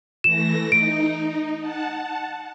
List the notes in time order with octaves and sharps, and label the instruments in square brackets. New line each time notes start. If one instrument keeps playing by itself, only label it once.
[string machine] E3 A3 A#6 [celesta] E7
[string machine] D#4 [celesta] D7
[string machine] F#5 A5